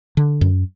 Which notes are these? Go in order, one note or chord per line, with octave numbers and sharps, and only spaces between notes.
D3
F#2